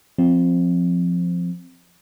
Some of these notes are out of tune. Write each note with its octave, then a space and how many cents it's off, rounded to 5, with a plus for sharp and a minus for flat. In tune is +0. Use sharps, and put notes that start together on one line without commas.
F3 +5 C4 +0